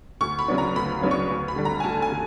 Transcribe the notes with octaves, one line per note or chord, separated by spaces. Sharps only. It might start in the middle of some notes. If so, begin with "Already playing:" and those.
D2 C#6
B5
C#3 F#3 B3 D4
A#5
D2 B5
C#3 F#3 B3 D4
C#6
D2
B5
D3 G3
A#5
G#5
D2 A5
G#5
D3